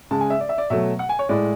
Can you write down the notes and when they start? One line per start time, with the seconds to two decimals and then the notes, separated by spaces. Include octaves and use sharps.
0.11 C#3 G#3 A5
0.21 G#5
0.30 E5
0.40 D5
0.49 E5
0.58 D5
0.70 B2 F#3 A3 E5
0.99 F#5
1.09 G#5
1.19 C#5
1.29 A2 G#3 D5